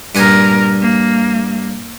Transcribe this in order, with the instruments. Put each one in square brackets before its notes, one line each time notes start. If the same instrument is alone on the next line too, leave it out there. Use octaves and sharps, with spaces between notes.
[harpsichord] G2 F#5 G#5 [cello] A#2 A#4
[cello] A#3